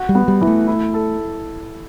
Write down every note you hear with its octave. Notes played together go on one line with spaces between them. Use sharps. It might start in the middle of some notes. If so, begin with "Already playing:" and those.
Already playing: F#4
G3
B3
G3
E3
A3
E4
A4